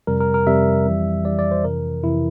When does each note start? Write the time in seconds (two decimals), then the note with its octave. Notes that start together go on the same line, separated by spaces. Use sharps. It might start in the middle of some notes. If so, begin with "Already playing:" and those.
0.07 F2 C3 G3 A#4
0.20 A#4
0.34 A#4
0.47 F2 C3 G3 E5
0.85 F2 E3 G3
1.25 F2 E3 G3 D5
1.39 D5
1.51 C5
1.64 F2 C3 E3 A#4
2.04 F2 C3 E3 E4